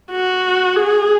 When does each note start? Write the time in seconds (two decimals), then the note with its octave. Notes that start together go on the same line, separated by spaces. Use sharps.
0.11 F#4
0.76 G#4